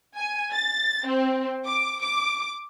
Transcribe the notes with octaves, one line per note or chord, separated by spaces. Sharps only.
G#5
A6
C4
D6
D6